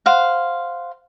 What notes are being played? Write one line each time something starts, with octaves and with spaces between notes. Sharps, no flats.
C5 F5 F#5